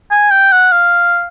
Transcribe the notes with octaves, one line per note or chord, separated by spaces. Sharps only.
G#5
G5
F#5
F5